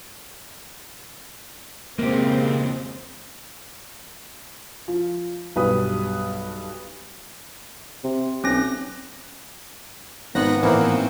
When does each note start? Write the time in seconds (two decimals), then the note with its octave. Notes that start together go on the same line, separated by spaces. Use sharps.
1.99 F2 C#3 G#3 A#3 C4 G4
4.88 F3
5.56 B1 G2 B4 D#6
8.04 C3
8.44 B1 C4 C#4 A#6
10.35 G#1 D#3 B3 F#6 A#6
10.63 A2 E3 A#3 C4